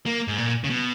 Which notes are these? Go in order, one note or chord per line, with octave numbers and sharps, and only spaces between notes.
A#3
G#2
A#2
C#3
B2